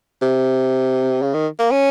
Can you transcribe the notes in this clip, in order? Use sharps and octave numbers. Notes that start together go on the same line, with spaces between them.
C3
C#3
D#3
A#3
C#4